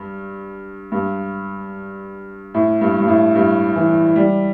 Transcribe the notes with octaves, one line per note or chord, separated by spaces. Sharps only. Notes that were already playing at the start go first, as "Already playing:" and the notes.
Already playing: G2
G2
A2
G2
G2
A2
G2
E3
G3